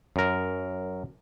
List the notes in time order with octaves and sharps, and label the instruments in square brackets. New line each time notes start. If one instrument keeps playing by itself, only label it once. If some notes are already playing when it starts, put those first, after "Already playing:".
[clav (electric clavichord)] F#2 A#4